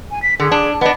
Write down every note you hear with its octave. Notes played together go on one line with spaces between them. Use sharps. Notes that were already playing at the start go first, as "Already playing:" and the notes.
G#5
B6
D3 G#4
D4
B3 D4 D#5